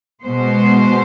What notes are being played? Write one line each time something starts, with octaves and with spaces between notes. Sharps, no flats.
B2 G#3 B3 C5